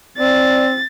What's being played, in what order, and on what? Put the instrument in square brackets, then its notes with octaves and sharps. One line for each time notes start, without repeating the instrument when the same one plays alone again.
[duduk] C4 [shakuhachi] D5 [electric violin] A6